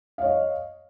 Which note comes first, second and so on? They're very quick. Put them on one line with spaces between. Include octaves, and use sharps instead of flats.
F5 C#5 D#5